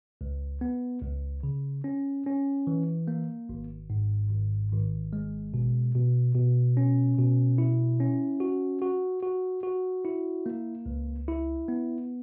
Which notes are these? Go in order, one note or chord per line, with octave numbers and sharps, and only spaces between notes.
C#2
B3
C#2
C#3
C#4
C#4
E3
A#3
G#1
G#2
G#1
G#1
G#3
B2
B2
B2
C#4
B2
E4
C#4
F#4
F#4
F#4
F#4
E4
A#3
C#2
E4
B3